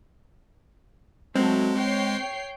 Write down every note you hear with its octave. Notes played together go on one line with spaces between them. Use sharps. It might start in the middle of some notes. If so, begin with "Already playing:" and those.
F#3 G#3 A3 C4
C#5 G5 C7